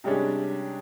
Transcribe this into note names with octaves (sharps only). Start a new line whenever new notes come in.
C3 G3 G#3 C#4 D4